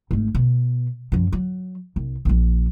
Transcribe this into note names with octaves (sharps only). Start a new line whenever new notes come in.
G#1 A3
B2
F#2 F3
F#3
C2
A#1 F3